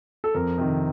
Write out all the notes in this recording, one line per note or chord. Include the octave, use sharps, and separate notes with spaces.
A4
F2 A#4
C3 D#3